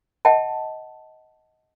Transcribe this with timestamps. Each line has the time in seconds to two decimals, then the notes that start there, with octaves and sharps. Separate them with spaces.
0.25 D#5 F#5 G5 A5